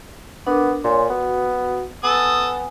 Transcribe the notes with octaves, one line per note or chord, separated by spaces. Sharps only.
B3 D4 A#4 D6
A#2 C#5 G#5 C6
B3 F#4
B3 A4 G#5 D#6